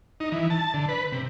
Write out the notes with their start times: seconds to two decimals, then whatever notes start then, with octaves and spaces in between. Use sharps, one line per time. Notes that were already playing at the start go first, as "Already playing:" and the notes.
0.20 D#4
0.32 E3
0.50 A5
0.74 D3
0.89 B4
1.12 C3